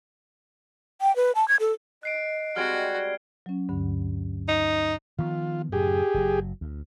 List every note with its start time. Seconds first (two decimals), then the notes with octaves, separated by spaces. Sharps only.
1.01 G5
1.16 B4
1.35 A5
1.48 G#6
1.60 A4
2.03 D#5 F#6 C7 D7
2.56 G3 G#3 C4 F#4 F6 G#6 D7
3.46 F#3 C#4
3.69 D2 G2 D3
4.48 D#4
5.19 D#3 F3 B3 F4
5.72 F#2 A2 C#3 G4 G#4
6.14 F#1 B2 F#3
6.61 D2